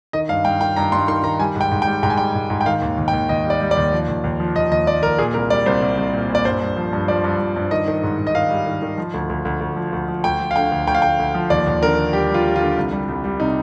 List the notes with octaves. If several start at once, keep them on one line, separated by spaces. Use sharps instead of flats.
D#3 D#5
G2 F5
G2 G5
D#3 G5
G2 A#5
G2 C6
D#3 C6
D#3 A#5
G3 G#5
G#2
G5
G#2
G5
G3
G#2 G5
G#5
G3 G5
G#2
G#2
G5
D#3 F5
D#2
D#2
G5
D#2
D#2 D#5
G3
D5
G3
D5
D#2
F3
D#2
D#2
F3
D#2 D#5
D#2 D#5
F3 D5
D#2 A#4
A#2 G#4
C2 A#4
G3 D5
C2 C5
C2
C2
A#2
A#2
D5
G2 C5
G2
F3
G2
F3 D5
G2
F3
G2
D#3 D#5
D#3
G#2
G#2
D#5
D#3 F5
G3
D#3
D#3
F3
D2
D2
D2
D2
F3
D2
F3
D2 G5
F3
F5
D3 G5
D2
D2 G5
F5
D2 G5
D2
F3
D#2 D5
D#2
D3 A#4
D3
G3 G4
G3 F4
G3
F4
D3
C2
G3
C2
G3
C3 D#4